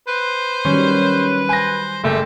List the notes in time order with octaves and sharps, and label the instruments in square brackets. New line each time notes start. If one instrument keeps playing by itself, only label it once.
[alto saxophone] B4 [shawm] C5
[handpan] D#3 F#3 G3 [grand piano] C#4
[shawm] C5 [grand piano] G#5 A#6
[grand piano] F#1 [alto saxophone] A3 [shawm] G4